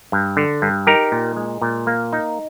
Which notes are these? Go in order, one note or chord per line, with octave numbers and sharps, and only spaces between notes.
G2
D3
G2
D#4 G4 A#4
A#2
G#3
A#2
A#3
D#4